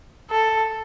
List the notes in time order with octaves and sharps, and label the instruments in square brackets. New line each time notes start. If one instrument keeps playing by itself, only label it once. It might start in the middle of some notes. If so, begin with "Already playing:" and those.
[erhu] A4